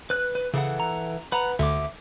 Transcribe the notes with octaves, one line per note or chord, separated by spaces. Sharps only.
B4 F#6
B4
C#3 E3 A4 F#5
A#5
B4 F#5 A#5 B5
D2 D3 E5 D6